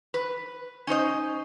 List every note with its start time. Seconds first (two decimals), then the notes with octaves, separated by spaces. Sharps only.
0.14 B4
0.87 C#4 D#4 C5 D#5